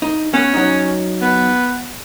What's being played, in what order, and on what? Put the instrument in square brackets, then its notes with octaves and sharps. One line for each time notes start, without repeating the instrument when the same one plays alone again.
[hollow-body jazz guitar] D#4
[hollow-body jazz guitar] B3 [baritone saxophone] C#4
[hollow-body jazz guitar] F#3 D#4
[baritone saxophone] B3